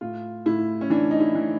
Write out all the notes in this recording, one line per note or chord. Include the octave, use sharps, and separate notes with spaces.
A2 F4
A2 E4
C#4
E3 D4
D#4
E4
E3